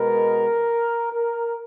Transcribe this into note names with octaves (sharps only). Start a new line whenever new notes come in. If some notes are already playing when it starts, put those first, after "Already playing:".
Already playing: B2 G#3 B3 A#4
A#4